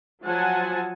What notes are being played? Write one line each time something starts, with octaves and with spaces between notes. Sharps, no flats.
F3 F#3 F#5 G#5 A5